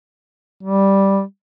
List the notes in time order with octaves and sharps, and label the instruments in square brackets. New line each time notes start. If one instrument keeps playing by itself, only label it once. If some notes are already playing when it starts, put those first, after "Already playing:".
[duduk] G3